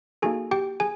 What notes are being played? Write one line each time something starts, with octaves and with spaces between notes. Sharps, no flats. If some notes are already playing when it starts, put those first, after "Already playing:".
A#3 D#4 F#4 G#4 A4 G#5
G4 G5
G#4 G#5